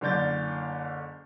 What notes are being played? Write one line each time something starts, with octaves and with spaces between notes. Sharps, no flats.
F#1 D3 D5 G6 A6